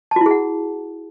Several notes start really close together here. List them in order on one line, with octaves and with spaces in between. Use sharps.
A5 F#4 E4 G#4 F#5